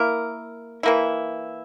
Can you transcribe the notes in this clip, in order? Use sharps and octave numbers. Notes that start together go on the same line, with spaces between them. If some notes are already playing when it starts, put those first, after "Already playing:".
Already playing: A#3 E4 A#4
E3 A#3 E4